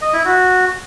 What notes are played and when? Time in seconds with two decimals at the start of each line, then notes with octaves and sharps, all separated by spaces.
0.01 D#5
0.13 E4
0.25 F#4